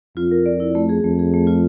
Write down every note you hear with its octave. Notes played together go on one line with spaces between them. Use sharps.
F2 F4
A#4
D5
E4
A3
G#4
F2 A3
G#4
A3
F4